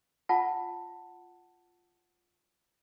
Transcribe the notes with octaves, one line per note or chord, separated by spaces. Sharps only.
F4 F#5 A5